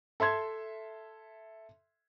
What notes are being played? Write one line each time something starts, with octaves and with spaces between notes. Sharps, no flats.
A4 E5 C6 G#6